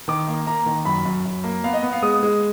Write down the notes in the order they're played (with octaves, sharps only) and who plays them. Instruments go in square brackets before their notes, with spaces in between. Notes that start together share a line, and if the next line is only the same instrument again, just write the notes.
[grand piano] D#3 D6
A#3
A#3 A#5
D#3
F#2 B5
F#2
F#2
A#3
B3 F5
D#5
B3
F5
G#3 D#6
G#3